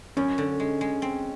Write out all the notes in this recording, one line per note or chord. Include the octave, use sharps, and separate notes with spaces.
F#2 C#4
D3
G#3
G#3
C4